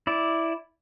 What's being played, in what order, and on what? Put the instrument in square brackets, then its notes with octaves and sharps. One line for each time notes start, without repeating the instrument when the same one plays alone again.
[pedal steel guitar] E4 D5